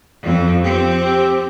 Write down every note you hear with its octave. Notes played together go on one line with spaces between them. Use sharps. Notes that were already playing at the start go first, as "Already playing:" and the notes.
F2 C4
C4 G4
G4